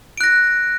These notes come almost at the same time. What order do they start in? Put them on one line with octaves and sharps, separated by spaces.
D7 F#6 A#6